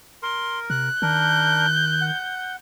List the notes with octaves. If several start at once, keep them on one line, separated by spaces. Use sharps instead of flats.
A#4 C6
C3 F#6
D#3 D4 A#4 G6
F#5